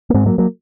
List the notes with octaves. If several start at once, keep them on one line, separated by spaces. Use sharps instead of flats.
A#3
G#2 G#3 C4
F#3 A#3
F#3 A#3